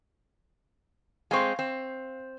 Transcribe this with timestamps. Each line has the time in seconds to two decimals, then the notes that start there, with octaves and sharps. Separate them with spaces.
1.31 G#3 C4 F5 C6 C#6
1.59 C4